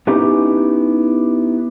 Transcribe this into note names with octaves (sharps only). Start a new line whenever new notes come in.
B3 C#4 D#4 E4 G4